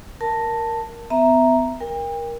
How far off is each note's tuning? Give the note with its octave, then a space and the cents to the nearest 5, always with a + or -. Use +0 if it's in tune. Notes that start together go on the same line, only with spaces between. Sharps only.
A#4 +0 A5 +10
B3 +35 E5 +0 A#5 +0
A#4 +10 G5 +40